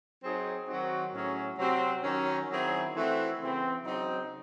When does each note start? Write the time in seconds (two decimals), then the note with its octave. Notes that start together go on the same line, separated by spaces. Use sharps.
0.22 F#3 C4 D#4 G#4
0.67 D#3 F#3 C4 D#4 F#4
1.12 A2 F#3 C#4 G#4
1.57 C3 F#3 C4 F#4
2.03 D#3 F#3 C#4
2.49 D#3 F#3 C4 E4 G#4
2.93 E3 A3 C4 F#4
3.39 C#3 E3 C4
3.84 C#3 F#3 C4 D#4